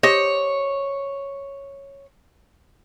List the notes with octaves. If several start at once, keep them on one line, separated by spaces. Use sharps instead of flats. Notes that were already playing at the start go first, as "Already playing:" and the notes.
G4 C5 C#5 D#5